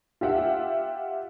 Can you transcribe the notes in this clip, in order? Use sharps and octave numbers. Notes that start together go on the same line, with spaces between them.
F4 G4 E5 F#5